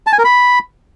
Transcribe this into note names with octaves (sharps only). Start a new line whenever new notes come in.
A5
G#5
A#4
B5